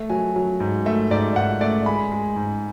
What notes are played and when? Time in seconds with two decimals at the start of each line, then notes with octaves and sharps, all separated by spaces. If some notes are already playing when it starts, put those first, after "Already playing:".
Already playing: A3
0.10 F#3 G#5
0.36 F#3
0.60 G#2
0.86 A3 E5
1.11 G#2 D5
1.36 G#2 F#5
1.61 A3 D5
1.86 G#3 B5
2.12 G#3
2.36 G#2